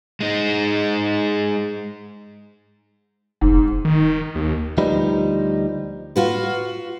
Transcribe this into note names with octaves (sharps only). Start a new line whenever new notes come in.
G#3 D#4
F1 G#2
D#3
D#2
D2 F3 G3 D#4 B4
F4 F#4 B4